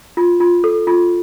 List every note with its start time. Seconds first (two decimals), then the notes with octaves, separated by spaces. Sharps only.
0.17 F4
0.40 F4
0.64 A4
0.87 F4